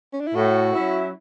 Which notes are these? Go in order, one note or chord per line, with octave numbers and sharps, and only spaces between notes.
C#4
D4
E4
A2 F#4
F#3 C#4 E4